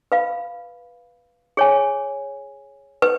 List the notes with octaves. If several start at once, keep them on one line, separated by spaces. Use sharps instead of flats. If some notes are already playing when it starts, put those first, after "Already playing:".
B4 F5 B5
G#4 C#5 G#5
B4